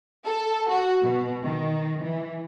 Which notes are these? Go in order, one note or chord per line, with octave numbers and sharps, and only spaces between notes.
A4
F#4
B2
D#3
E3